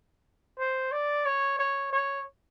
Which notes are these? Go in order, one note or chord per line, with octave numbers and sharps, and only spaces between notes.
C5
D5
C#5
C#5
C#5